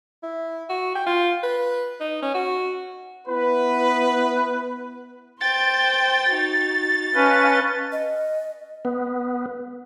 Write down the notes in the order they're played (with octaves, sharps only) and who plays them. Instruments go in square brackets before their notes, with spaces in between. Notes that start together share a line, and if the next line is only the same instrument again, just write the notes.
[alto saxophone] E4
F#4
G5
F4
B4
D#4
C#4
F#4
[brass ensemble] B3 E4 B4
[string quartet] C5 G5 [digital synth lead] A6
[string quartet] D#4 F#4
[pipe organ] C#4 B4 [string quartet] D#5 F5 A5
[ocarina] D#5
[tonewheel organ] B3